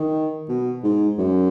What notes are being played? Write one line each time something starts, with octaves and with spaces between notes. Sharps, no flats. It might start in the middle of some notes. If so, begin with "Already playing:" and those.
Already playing: D#3
B2
G#2
F#2